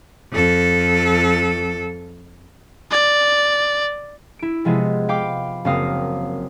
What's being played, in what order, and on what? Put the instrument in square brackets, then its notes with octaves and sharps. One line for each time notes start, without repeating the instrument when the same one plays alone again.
[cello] F2 A4
[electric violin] D5
[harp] E4 D7
C3 F3 G#3 B3
F5 G5 B5 D6
F#1 F#3 A#3 C4 F5 D#6